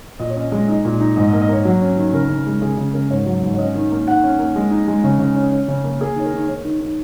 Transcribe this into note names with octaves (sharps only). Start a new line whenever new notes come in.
A#2 D#5
C#5
C#4 D#5
G#3 D#5
D#4 D#5
A#2
D#4
G#2 D#5
D#5
A#3
D#5
A#3 C#5
F#3
C#4
D#3
C#3 A#4
C#3
G#3
C#3 G#4
C#3
C#3 A#4
G#2 C#5
F#3
G#2
C#5
C#4 D#5
D#3
A#3
D#3 F#5
C#4
A#3
G#3
D#4
G#3
C#3 C#5
C#3
C#4
C#4
C#3
A#3
A#3 G#4
D#3 C#5
A#4
D#3
D#3 C#5
D#3
D#3